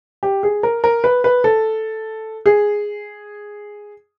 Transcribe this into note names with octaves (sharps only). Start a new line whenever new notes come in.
G4
G#4
A#4
A#4
B4
B4
A4
G#4